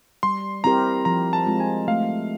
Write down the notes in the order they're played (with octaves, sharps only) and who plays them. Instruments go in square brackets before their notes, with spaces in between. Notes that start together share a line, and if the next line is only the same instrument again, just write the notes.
[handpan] G3 [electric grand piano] C6
[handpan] C4 E4 G4 A#4 [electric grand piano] A#5
[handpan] F3 [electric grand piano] A#5
[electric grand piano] A5
[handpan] G#3 C4 F4
[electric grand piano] G#5
[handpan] A3 [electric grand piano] F5